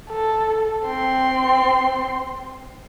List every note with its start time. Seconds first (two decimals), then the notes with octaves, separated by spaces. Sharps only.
0.10 A4
0.87 C4 C6